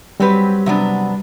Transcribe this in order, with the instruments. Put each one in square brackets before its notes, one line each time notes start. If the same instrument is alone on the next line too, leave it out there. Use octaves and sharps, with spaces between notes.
[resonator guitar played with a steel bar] F#3 C4 G4 B4 [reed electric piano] G3
[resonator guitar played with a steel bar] C3 F#3 B3 D4